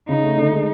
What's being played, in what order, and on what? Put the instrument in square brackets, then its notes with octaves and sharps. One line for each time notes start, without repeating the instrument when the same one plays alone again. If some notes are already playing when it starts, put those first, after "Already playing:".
[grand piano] C#3 [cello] D#4
[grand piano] A3
D3
G#3